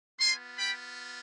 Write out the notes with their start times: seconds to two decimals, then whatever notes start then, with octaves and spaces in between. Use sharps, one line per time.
0.19 B3 F4 G#5 C6
0.57 G5 B5